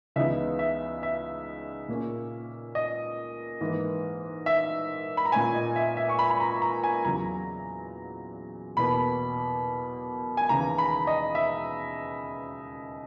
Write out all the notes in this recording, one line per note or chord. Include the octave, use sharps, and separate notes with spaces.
C#2 C#3 E3 B3 D#4 E5
E5
E5
A#2 A#3 C#4
D#5
G#2 E3 A#3
E5
B5
A#5
A#2 A#3 C#4 G#5
D#5
E5
E5
C#6
B5
B5
A#5
A#5
G#5
E2 C#3 F#3 A#5
E2 B2 A#3 B5
G#5
D#2 C#3 E3 A#5
B5
D#5
E5